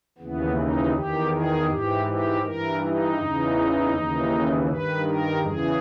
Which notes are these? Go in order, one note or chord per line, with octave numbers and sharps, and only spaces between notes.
D#2 C#3 E3 B3
D#4
E2 D#3 G4
G#4
G#2 E3 G4
G4
G2 E3 A#4
D#4
E2 C#3 E3
D#2 C#3 E3
G2 D#3 B4
A#4
E2 C#3 E3 G#4